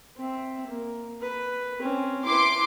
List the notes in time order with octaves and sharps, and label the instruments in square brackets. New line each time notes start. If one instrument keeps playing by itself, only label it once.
[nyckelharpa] C4 E5
A#3
B4
C4 C#4
[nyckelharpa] E4 B4 [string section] C6 D6